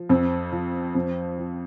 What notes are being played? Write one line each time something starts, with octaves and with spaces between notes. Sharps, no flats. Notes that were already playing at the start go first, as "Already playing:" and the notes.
Already playing: F3
F2 C4
F3
F2
F3